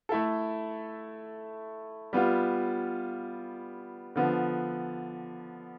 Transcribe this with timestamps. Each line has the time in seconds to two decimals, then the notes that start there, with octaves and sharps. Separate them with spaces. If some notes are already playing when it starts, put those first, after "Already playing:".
0.09 A3 E4 A4
2.13 G3 B3 F4
4.16 D3 F3 B3